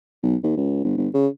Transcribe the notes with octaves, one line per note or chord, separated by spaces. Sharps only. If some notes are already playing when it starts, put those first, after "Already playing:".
B1
D#2
C#2
G1
G1
C#3